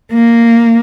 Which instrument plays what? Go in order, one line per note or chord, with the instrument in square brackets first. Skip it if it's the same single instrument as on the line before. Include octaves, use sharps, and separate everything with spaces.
[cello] A#3